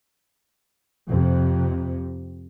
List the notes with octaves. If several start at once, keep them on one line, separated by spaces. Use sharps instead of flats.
F2 C3